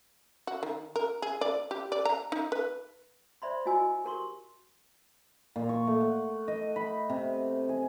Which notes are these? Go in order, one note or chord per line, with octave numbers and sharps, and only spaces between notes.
F#4
D#3
A#4
G#4
D5
G4
D5
A#5
D#4
B4
C5 D5 E5 B5 C6
E4 F#4 D#5 G#5 E6
G4 A#4 C6 C#6
A#2
C#6
A3
F#5
D#5
B5
C3
G#4